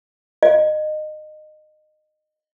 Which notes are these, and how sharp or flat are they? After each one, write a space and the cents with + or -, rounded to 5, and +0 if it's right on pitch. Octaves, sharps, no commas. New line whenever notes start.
D#5 -20